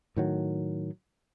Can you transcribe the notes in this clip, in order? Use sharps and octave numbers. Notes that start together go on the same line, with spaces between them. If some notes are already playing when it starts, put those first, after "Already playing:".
A2 D#3 F#3